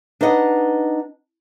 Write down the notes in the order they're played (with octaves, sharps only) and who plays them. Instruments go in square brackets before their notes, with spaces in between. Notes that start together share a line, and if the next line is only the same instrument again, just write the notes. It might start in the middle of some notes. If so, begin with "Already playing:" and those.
[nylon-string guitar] D4 D#4 B4 D#5 F#5